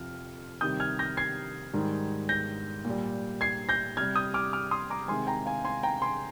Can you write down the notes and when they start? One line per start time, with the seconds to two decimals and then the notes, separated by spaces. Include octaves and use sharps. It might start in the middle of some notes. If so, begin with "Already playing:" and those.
Already playing: F2 C3 F3 F6
0.61 C3 D#3 G3 D#6 G6
0.80 F6 G#6
0.99 G6 A#6
1.17 G#6 C7
1.73 G#2 D#3 G3
2.29 G6 A#6
2.85 A#2
2.90 G3
3.41 G#6 C7
3.69 G6 A#6
3.97 C3 G3 F6 G#6
4.16 D#6 G6
4.34 D6 F6
4.53 D6 F6
4.71 C6 D#6
4.90 A#5 D6
5.08 C3 D#3 G#3 G#5 C6
5.27 G5 A#5
5.46 F5 G#5
5.65 G#5 C6
5.83 G5 A#5
6.02 G#5 C6